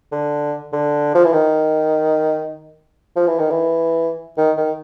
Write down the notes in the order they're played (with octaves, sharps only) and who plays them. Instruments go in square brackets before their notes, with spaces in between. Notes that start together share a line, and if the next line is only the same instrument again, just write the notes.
[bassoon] D3
D3
F3
E3
D#3
F3
E3
D#3
E3
D#3
D#3